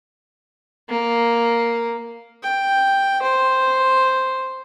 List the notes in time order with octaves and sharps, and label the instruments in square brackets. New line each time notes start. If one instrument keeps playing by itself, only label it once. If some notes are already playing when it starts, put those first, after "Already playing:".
[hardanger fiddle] A#3
[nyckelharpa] G5
C5